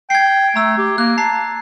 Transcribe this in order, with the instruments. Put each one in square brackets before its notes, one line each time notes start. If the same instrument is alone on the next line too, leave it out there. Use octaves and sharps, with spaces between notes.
[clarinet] G5 [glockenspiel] G#6 C7
[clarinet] A3 [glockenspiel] A#5 E6
[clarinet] G4
[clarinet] A#3 [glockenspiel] F#6
[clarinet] A5 [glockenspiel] A#5 C7